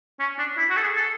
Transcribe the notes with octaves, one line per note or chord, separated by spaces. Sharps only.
C#4
D4
E4
F#4
A4
G#4
A4